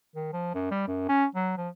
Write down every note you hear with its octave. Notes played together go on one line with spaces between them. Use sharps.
D#3
F3
F#2
G3
F#2
C#4
F#3
F3